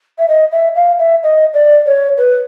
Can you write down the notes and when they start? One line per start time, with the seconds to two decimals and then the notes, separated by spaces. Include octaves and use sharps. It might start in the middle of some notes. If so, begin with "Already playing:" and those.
0.18 E5
0.28 D#5
0.51 E5
0.75 F5
0.99 E5
1.23 D#5
1.53 D5
1.86 C#5
2.17 B4